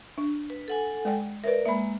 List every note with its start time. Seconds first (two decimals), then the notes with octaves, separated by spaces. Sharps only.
0.18 D4
0.50 B4
0.68 A4 F#5 G#5
1.05 G#3 D5 G5
1.44 A#4 B4 C#5 D5 E5
1.65 G#3 A#3 E5 B5